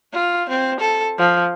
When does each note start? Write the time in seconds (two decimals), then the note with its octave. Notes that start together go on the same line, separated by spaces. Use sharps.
0.13 F4
0.49 C4
0.80 A4
1.18 F3